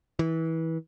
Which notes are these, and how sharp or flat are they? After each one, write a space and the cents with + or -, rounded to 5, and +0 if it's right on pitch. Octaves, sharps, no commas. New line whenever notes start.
E3 -25